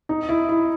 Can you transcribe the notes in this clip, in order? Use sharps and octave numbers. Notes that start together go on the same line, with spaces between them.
D#4
E4
E4